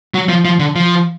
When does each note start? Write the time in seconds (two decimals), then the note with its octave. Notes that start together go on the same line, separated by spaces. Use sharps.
0.14 F#3
0.29 F3
0.45 F3
0.59 D3
0.75 F3